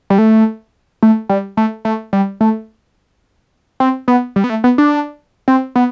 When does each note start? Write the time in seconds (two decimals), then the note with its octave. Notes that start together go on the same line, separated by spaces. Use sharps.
0.10 G3
0.18 A3
1.03 A3
1.29 G3
1.57 A3
1.85 A3
2.13 G3
2.41 A3
3.80 C4
4.08 B3
4.36 G3
4.44 B3
4.50 A3
4.64 B3
4.78 D4
5.48 C4
5.76 B3